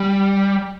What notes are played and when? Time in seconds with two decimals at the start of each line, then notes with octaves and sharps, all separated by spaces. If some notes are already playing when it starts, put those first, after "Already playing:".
Already playing: G3